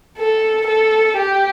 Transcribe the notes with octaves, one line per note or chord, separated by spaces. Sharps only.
A4
A4
G4